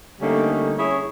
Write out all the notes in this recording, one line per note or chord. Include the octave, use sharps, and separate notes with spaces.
D3 G3 A3 A#3 C#4 D#4
C#4 E4 G#4 C#5